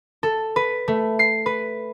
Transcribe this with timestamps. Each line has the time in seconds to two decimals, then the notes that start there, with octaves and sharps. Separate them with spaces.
0.23 A4
0.56 B4
0.88 A3
1.19 C7
1.46 B4